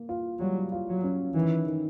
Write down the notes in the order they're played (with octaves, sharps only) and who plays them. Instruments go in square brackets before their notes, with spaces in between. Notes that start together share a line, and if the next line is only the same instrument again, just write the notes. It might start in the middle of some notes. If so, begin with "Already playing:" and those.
Already playing: [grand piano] A#3
F4
[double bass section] F#3 [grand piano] G3
[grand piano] F4
[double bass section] F#3
[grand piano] C#4
[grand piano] D#3 [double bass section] E3
[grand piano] D#3